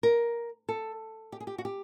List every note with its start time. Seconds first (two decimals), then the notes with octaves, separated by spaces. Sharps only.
0.03 A#4
0.69 A4
1.32 G4
1.40 G#4
1.47 G4
1.58 F#4
1.65 G4